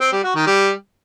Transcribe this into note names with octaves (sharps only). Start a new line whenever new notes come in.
C4
G3
F#4
D#3
G3